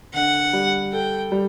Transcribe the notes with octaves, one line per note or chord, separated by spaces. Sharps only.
D3 F#5
G3
A4 G5
G3